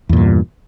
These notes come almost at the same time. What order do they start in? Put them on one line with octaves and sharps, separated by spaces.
E2 A#2 G2